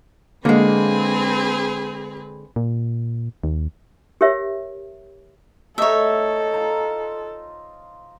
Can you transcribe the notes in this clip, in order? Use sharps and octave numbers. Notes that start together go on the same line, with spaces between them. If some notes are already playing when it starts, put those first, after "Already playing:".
D3 G#3 A#3 C4 G#4 B4
A#2
D#2
G4 A#4 C#5 E5
A3 D#4 A4 C#5 E5
F4 C5 A#5